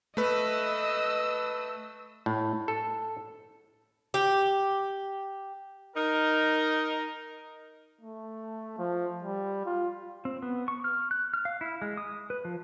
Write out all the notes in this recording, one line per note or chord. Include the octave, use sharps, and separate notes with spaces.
A3 B4 D#5 E6
A2
A4
G4
D#4 A#4
A3
F3
G3
F4
C4
B3
C#6
F6
F#6
F6
F5
E4
G#3
D#6
B4
F3